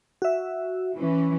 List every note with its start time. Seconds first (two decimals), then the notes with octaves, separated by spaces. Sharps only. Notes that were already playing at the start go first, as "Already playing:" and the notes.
0.22 F#4 E5
0.98 E3 C#4